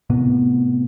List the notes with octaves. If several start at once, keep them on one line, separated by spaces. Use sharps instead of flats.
A2 C3 B3